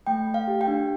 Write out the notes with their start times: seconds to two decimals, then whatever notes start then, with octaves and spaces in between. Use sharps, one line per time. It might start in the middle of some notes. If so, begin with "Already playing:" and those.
0.07 A3 G5
0.27 A3
0.34 F5
0.47 G4
0.61 G5
0.68 D4